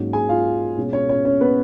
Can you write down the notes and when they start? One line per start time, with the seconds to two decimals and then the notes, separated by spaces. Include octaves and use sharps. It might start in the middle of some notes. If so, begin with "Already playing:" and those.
Already playing: G#2 F#3 A#3 C#4
0.13 G#4 G#5
0.29 F4 F5
0.77 B2 G#3 C#4
0.93 C#4 C#5
1.09 C#4 C#5
1.25 C#4 C#5
1.41 B3 B4